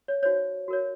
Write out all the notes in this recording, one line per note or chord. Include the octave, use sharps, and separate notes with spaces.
C#5
D#4 F#4 C5 C#5
F#4 A#4 C#5